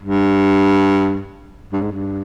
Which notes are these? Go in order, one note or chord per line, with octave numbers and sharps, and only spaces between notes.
G2
G2
G#2
G2